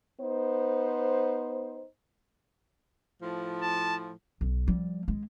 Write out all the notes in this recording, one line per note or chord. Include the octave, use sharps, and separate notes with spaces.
B3 D#4 C5
A2 F3
A5
B1
F3 G3
G#3